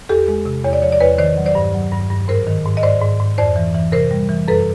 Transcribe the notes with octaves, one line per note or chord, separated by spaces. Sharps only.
E2 G4 A4
G#3
C3
E2 C#5
D5
F3 C#5
D5
E2 B4 C#5
D#3 C5 D5
F#3
C5 D5
G2
F#3
G2
G2
G#2 A#4 C5
D#3
G#2
D#5
G#2 C5 D5
G#2
G#2
F2 C5 D5
E3
E3
C3 A#4 C5
G3
E3
F#2 A4 B4